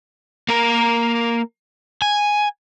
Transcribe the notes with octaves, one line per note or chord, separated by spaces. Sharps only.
A#3 A#4
G#5